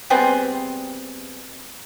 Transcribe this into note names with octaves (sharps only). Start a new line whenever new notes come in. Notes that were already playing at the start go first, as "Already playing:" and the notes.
G3 B3 C4 G#4